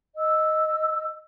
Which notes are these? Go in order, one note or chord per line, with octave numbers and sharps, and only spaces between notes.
D#5 E6